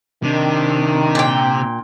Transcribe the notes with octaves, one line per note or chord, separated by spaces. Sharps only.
C3 D#3 D4
A#2 G5